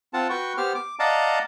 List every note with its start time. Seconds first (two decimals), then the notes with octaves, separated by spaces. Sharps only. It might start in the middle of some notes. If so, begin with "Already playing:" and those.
0.14 C4 F4 F#5 A5
0.30 F#4 B4 G5 C#6
0.57 B3 G4 C5 F6
0.75 D6
0.99 D5 D#5 F5 F#5 A5 A#5